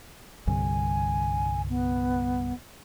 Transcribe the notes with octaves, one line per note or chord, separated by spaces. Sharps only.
C2 G2 D3 G#5
B3